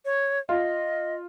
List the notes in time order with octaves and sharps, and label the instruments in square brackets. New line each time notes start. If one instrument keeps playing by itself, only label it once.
[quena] C#5
[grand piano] F4 [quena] D#5